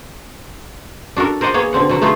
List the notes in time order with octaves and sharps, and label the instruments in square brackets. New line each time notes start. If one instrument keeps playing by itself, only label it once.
[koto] D4 F#4 A4 A#4
A#4 C5 D5 D#5 F#5
A#3 B3 G#4 C#5
B2 D3 C4 F#5
B2 F#3 F#5
A3 B3 D#4 F4